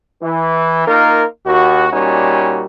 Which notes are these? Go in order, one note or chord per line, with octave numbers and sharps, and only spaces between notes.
E3
A#3 D#4 F4 A#4
D#2 F#4
A#2 G3 C#4 D#4 F#4